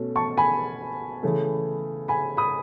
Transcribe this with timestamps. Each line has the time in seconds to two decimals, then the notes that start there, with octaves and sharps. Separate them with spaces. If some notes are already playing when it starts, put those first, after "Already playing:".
Already playing: B2 A3 C#4
0.16 A5 C#6
0.37 G#5 B5
1.23 C#3 E3 A3
2.08 G#5 B5
2.37 B5 D#6